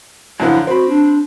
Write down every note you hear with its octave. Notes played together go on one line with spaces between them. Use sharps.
F#2 D3 F3 E4
C4 F#4 B5
D4